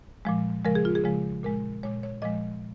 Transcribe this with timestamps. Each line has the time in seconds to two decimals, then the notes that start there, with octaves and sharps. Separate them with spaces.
0.25 A#2 F3 G#3
0.64 C#3 F3 G#3 A#4
0.75 G#4
0.85 F4
0.95 G#4
1.04 C#3 F3 G#3
1.43 A#2 G#3 A#4
1.83 A#2 G#3 C#5
2.03 C#5
2.22 A#2 F3 G#3 D#5